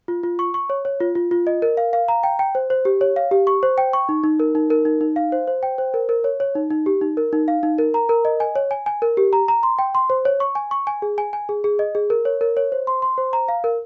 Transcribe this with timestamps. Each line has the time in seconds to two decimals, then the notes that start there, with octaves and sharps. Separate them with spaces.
0.08 F4
0.23 F4
0.39 C#6
0.54 C#6
0.70 C#5
0.85 C#5
1.00 F4
1.15 F4
1.31 F4
1.47 D#5
1.62 A#4
1.77 F5
1.93 F5
2.08 A#5
2.24 G5
2.39 G5
2.55 C5
2.70 C5
2.85 G4
3.01 C#5
3.16 F5
3.31 G4
3.47 C#6
3.63 C5
3.78 G5
3.93 C#6
4.09 D#4
4.24 D#4
4.40 A#4
4.55 D#4
4.70 A#4
4.85 D#4
5.01 D#4
5.16 F5
5.32 C5
5.47 C5
5.63 G5
5.78 C5
5.94 A#4
6.09 A#4
6.24 C#5
6.40 C#5
6.55 D#4
6.71 D#4
6.86 G4
7.01 D#4
7.17 A#4
7.33 D#4
7.48 F5
7.63 D#4
7.78 A#4
7.94 A#5
8.09 A#4
8.25 D#5
8.40 G#5
8.56 C#5
8.71 G#5
8.86 G#5
9.02 A#4
9.17 G4
9.33 A#5
9.48 A#5
9.63 C6
9.79 G5
9.95 C6
10.10 C5
10.25 C#5
10.40 C#6
10.55 G#5
10.71 C#6
10.87 G#5
11.02 G#4
11.18 G#5
11.33 G#5
11.49 G#4
11.64 G#4
11.79 D#5
11.95 G#4
12.10 A#4
12.25 C#5
12.41 A#4
12.57 C#5
12.72 C5
12.87 C6
13.02 C6
13.18 C5
13.33 A#5
13.48 F5
13.64 A#4